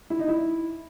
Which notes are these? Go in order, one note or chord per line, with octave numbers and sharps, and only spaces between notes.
E4
D#4
E4